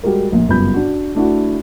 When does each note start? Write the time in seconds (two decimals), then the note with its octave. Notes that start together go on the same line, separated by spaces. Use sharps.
0.03 G3 G#3 F#4 A#4
0.32 A#1 A#2
0.48 F#1 G2 B3 F4 B5 G6
0.74 D4 F#4
1.15 A3 D4 E4 F#4